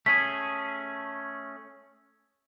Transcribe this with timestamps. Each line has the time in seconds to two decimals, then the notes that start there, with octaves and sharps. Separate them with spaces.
0.06 A3 C#4 G#4 B6